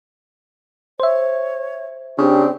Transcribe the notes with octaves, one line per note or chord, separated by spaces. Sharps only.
C5 C#5 E5
C#3 C4 D4 G4